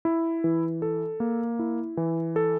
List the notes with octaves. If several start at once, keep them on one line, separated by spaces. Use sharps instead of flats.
E4
E3
A4
A#3
E4
E3
A4